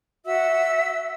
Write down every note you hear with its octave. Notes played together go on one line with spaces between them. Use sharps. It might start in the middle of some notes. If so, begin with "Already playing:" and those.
F#4 E5 E6
F#4